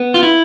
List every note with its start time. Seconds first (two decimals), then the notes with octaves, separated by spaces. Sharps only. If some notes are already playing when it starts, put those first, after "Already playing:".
Already playing: B3
0.14 F4
0.23 E4